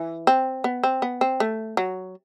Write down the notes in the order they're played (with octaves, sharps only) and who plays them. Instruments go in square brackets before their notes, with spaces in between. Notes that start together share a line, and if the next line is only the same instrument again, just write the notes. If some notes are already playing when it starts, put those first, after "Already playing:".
Already playing: [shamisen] E3
C4
B3
C4
B3
C4
A3
F#3